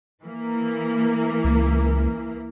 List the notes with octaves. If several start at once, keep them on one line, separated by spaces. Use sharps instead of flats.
E3 A#3
C#2